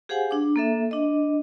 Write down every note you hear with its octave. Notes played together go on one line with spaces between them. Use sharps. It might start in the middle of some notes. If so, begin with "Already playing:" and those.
G4 G#4 C5 F5 F#5 G#5
D4 D6
A#3 A4 E5
D4 D#5